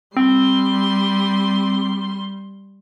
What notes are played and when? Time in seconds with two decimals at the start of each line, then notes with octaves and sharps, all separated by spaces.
0.17 G3 C4 C6